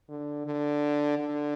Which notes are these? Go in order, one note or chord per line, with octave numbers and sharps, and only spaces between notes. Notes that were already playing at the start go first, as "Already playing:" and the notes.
D3
D3
D3